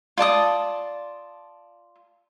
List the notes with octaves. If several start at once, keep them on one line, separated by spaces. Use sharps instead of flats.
F4 D5 A5 D#6